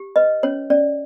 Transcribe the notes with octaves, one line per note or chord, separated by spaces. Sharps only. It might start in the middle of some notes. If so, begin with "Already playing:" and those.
Already playing: G4
B4 D#5
C#4 C#5
C#4 D5